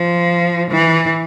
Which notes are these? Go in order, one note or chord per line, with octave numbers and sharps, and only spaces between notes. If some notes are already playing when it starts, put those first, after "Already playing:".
Already playing: F3
E3